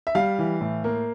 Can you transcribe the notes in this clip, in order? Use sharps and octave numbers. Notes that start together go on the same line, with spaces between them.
E5
G3 F5
E3
A2
A#3